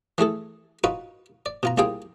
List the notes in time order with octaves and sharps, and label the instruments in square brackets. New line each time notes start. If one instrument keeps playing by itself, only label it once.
[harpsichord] E3 A3 G#4 A4
D#4 F4 F#4 B4
D5
B2 F4 A#5
C2 A#3 F4 G#4 G5